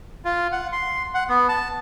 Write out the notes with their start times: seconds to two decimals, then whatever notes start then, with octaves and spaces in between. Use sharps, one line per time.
0.25 F4
0.52 F#5
0.72 C6
1.14 F#5
1.29 B3
1.49 A5